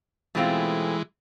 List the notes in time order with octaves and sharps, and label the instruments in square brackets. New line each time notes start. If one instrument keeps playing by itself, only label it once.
[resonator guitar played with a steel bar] B2 A3 C4 F4 [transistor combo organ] E3 G#3